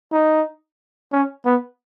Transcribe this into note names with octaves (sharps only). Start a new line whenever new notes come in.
D#4
C#4
B3